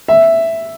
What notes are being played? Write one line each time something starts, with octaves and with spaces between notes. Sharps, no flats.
E5